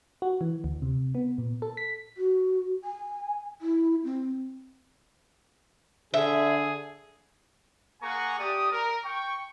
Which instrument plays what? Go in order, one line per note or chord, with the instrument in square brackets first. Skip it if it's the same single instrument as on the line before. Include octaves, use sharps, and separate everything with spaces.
[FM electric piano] F#4
E3
D2
C3
B3
A#2
A4
B6
[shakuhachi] F#4
G#5
E4
C4
[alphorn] D3 [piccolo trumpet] G#4 [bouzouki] E5
[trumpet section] A#3 G#4 F#5 G#5 A#5 C#6
A3 G4 D5 D#6
A#4
G5 C#6